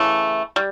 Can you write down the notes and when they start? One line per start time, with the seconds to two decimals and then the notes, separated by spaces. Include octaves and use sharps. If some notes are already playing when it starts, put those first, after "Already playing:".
Already playing: C#3 E3 A3
0.56 G3